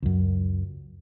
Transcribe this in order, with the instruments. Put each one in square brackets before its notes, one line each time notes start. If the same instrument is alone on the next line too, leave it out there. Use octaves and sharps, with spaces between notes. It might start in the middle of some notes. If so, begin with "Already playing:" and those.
[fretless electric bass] C#2 F#2